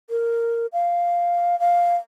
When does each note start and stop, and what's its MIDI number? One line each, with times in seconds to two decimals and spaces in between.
0.10 0.66 70
0.73 1.59 77
1.60 1.96 77